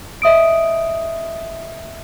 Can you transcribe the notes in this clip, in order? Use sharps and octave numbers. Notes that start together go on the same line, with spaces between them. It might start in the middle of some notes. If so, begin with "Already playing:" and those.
D#5 E5 D#6 D7